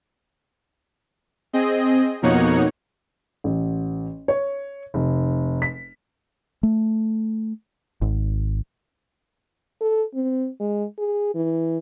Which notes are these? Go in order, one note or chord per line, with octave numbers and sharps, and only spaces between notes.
C4 G#4 D#5
F2 B2 A#3 D#4 C#5 F#5
A1
C#5
F1
B6
A3
G#1
A4
C4
G#3
G#4
E3